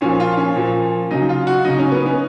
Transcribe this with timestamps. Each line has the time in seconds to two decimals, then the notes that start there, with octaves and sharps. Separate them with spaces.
0.01 A#2 F3 C#4
0.20 F4
0.37 C#4
0.56 A#2 F3
1.10 C#3 F#3 D#4
1.29 F4
1.47 F#4
1.65 C#3 F#3 D#4
1.79 C#4
1.92 B3
2.06 C#4